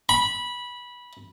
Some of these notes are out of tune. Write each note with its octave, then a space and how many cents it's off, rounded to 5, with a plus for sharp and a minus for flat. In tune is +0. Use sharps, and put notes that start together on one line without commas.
B5 -15